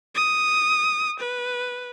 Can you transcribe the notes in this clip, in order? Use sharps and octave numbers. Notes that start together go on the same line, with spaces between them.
D#6
B4